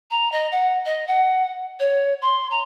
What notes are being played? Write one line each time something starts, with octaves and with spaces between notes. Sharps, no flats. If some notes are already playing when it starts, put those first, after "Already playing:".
A#5
D#5
F#5
D#5
F#5
C#5
C6
A#5